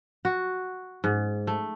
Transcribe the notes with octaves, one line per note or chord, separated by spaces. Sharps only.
F#4
G#2
A3